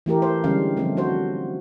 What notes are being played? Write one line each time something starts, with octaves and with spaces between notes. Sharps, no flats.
E3 A3 G4 A#4
C5
D3 G3 G#3 C#4 F5
D3 F3 G3 A3 C4
F3 F#3 F#4 C5